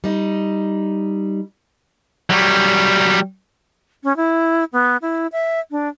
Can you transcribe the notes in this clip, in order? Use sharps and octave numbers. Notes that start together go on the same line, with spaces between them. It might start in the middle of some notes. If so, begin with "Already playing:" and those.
G3 D#4
F#3 G3
C#4
E4
B3
E4
E5
D4